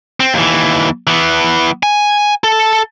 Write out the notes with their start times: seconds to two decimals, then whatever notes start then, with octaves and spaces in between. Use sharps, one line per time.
0.20 C4
0.34 D#2 E3
1.07 E3 B3
1.83 G#5
2.44 A4